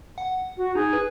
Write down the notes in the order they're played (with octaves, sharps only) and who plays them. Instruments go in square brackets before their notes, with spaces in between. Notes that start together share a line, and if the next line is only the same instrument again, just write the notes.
[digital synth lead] F#5
[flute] F#4
[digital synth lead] D#4 [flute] G#4
[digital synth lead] B4